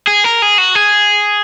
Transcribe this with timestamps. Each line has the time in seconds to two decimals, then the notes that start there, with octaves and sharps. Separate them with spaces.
0.07 G#4
0.24 A#4
0.42 G#4
0.58 F#4
0.75 G#4